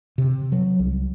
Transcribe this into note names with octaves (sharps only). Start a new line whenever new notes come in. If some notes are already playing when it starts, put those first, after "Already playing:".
C3
F#3
C2